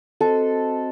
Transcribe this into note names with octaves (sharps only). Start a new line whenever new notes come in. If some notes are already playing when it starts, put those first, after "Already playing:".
C4 F#4 A4 C5 D#5